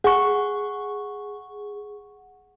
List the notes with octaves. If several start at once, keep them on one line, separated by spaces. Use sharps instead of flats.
G#4 F#5 C#6